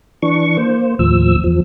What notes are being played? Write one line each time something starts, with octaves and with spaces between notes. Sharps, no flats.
E3 D4 C#6
A#3 C5
D#2 A2 F3 E6
E2 F3